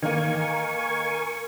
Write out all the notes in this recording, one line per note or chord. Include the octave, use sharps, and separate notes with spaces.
D#3 A#3 A#4 G#5 C#6